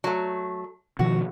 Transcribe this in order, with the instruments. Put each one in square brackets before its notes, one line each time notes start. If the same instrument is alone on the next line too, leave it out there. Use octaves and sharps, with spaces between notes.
[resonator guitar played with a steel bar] F#3 A3
[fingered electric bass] B2 D#3 F3 [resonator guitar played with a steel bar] F#4